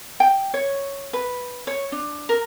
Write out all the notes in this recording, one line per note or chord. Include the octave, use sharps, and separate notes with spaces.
G5
C#5
B4
C#5
D4
A#4